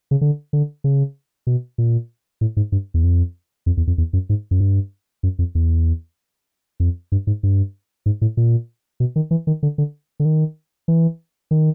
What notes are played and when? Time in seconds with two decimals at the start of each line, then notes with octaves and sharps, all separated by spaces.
0.11 C#3
0.21 D3
0.53 D3
0.84 C#3
1.47 B2
1.78 A#2
2.41 A2
2.57 G#2
2.72 G2
2.94 E2
3.04 F2
3.66 F2
3.77 E2
3.87 F2
3.98 E2
4.13 F#2
4.29 G#2
4.51 F#2
4.61 G2
5.23 F#2
5.39 F2
5.55 E2
6.80 F2
7.12 G2
7.27 G#2
7.43 G2
8.06 G#2
8.21 A2
8.37 A#2
9.00 B2
9.16 D#3
9.31 E3
9.47 D#3
9.63 D3
9.78 D3
10.20 D3
10.25 D#3
10.88 E3
11.51 D#3